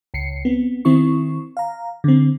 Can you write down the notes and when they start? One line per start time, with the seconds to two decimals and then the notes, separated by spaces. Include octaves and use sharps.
0.14 C#2 C7 C#7
0.45 B3 C4
0.85 D#3 C4 E4 C#6
1.57 F5 A#5
2.04 D3 C4